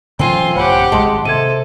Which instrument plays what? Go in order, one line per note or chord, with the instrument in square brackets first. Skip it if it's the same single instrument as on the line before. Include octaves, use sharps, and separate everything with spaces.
[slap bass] C#3 E3 F#3 [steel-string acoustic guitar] C4 G#5 [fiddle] F4 C6
[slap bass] A1 F#2 [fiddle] G4 F#5 [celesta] C5 C#5 B5
[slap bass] D1 G#1 [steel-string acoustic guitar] G#3 [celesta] A5 C6
[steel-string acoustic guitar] C3 [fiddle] A4 [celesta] G#6 D#7